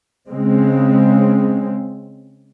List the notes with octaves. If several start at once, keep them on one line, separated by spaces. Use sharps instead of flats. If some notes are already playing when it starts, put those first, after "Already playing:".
C#3 G#3 C4